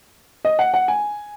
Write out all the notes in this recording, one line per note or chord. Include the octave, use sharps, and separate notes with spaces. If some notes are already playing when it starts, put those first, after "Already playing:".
D#5
F#5
F#5
G#5